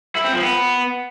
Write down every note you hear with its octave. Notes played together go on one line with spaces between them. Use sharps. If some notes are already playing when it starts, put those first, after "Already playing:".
E4
C4
F3
B3